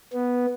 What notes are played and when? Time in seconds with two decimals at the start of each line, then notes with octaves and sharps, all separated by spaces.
0.13 B3